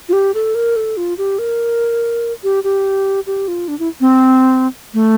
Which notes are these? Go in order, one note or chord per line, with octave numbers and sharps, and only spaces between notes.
F4
G4
A4
A#4
A4
F4
G4
A#4
G4
G4
G4
F4
D4
E4
C4
A3